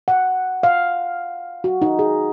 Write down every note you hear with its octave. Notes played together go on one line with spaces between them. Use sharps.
F#5
F5
F#4
D#4
G#4